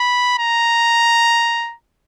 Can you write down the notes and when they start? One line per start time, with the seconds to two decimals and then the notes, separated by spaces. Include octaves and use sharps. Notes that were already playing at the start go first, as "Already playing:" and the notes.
Already playing: B5
0.39 A#5